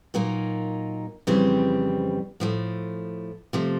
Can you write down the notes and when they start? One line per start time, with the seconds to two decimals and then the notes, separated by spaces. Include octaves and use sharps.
0.14 A#2 F#3 A#3 D#4
1.27 F2 C#3 E3 G3 C4
2.40 A2 F3 A3
3.53 C3 F3 A3